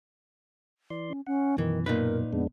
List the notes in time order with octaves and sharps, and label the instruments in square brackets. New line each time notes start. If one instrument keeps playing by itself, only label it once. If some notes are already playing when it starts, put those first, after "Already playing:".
[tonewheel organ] E3 D5 C6
[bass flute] C#4
[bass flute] C#4 [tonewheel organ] F#5
[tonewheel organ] F#2 B2 [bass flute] D#3 [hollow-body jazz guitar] E3
[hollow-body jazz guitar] A#2 D#4 B4 [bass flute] A#4
[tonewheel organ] F2 G#3 D4 [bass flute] B3